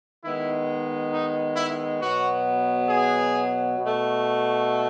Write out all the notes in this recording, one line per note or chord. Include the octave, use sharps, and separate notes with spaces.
D#3 G#3 B3 E4
D#4
E4
B2 F#3 B3 F#4
G#4
B2 A3